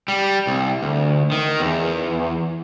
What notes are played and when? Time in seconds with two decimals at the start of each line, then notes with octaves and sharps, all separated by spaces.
0.08 G3
0.47 C2
0.83 D2
1.32 D#3
1.60 E2